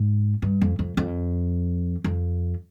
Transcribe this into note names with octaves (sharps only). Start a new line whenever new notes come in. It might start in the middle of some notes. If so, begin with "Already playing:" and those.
Already playing: G#2
G2
F2
F2
F2
F2